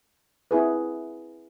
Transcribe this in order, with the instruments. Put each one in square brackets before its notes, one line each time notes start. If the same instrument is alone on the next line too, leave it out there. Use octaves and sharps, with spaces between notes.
[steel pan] C4 E4 G#4 B4